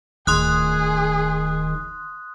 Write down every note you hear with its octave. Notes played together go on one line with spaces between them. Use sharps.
D1 D#3 F4 G#4 C6 D#6 F#6